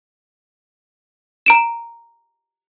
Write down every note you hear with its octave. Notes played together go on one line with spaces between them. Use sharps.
A#5 D7 E7